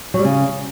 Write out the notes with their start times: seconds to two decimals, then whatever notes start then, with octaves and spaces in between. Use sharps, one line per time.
0.14 F#3
0.19 G3
0.24 C#3